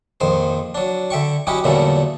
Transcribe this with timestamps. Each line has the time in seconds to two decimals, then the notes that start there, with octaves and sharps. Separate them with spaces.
0.20 A#1 F2 D#3 C5
0.75 F#3 D4
1.10 D3 E5 G5 C#6
1.47 F#3 C#4 D#4 E4 F#4 G4
1.64 E2 A#2 D3 F#3 G3 A3